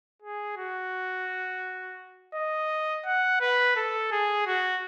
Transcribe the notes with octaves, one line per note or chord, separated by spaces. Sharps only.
G#4
F#4
D#5
F#5
B4
A4
G#4
F#4